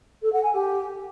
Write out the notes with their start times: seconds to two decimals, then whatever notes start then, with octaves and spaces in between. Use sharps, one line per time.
0.22 A4
0.32 F#5
0.43 G#5
0.53 G4